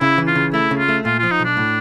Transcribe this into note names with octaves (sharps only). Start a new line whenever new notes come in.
C#3 E4
E3
F4
C#3
A3 E4
C#3
F4
A3
A#2 F4
F4
F3
D#4
B1
D4
A2